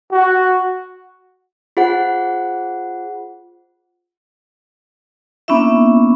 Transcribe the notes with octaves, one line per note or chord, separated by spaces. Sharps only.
F#4
F4 G#4 C5 F#5
A#3 B3 C#4 D4 E4 E5